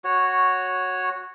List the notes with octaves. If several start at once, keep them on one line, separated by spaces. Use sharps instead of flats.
F#4 C#5